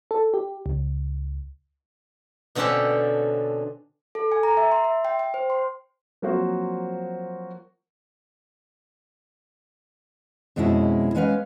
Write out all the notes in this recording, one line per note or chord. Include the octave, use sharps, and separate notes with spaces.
A4
G4
C#2
B2 D3 C4 C#4 G4 A4
A4
G#5
A#5
E5
C6
E5
G5
G5
C5
C6
F3 F#3 A#3 C4 F#4 C5
F2 B2 G#3 C#4 E4
G#3 B3 C#4 B4 E5 F5